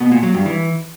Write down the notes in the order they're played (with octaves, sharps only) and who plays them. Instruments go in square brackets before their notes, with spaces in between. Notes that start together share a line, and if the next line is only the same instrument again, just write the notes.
[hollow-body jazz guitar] B2
A#2
F#3
G2
E3